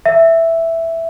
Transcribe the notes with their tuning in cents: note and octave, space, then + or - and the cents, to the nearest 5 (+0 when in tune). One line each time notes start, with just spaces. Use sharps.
E5 +0